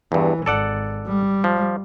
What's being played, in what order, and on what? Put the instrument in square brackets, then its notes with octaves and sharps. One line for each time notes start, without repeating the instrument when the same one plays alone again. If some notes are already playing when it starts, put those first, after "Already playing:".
[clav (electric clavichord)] E2 G2 [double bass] E3
[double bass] G#1 [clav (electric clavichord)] A4 D5 F#5
[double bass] G3
[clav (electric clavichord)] F3